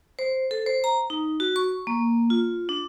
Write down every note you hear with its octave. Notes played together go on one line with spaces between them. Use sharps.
C5
A4
C5
A#5
D#4
F#4
C#6
A#3
F4
D4